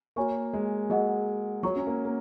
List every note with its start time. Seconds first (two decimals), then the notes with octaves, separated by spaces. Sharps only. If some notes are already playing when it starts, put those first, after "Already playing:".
0.16 A#3 F#4 C#5 G#5 C#6
0.53 G#3
0.90 F#3 G#4 D#5 F#5
1.63 F#3 C#5 A#5 C#6
1.76 C#4
1.87 A#3
2.05 A#3